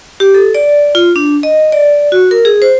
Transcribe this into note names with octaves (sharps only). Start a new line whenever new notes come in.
G4
A4
D5
F4
D4
D#5
D5
F#4
A#4
G#4
C5